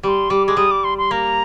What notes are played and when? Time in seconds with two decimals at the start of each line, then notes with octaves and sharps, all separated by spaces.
0.03 G3 D6
0.08 C6
0.30 G3 D6
0.47 G#3 D6
0.57 G3 D#6
0.71 D6
0.84 C6
0.98 C6
1.11 A#3 A#5